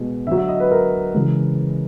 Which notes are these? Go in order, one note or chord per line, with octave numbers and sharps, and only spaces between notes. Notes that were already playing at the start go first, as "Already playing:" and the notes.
Already playing: B2 G#3
D3 F#3 E5
E5
D#5
B4
A#4
C#3 E3 G#3